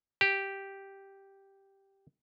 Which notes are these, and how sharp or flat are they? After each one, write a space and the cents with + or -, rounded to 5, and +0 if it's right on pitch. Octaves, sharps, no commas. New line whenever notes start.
G4 -5